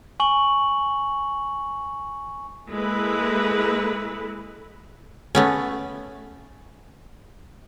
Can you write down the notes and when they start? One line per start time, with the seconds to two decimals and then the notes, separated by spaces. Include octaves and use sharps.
0.20 G#5 C#6 F#7
2.70 G#3 A#3 E4 A4 B4
5.35 A3 B3 C#4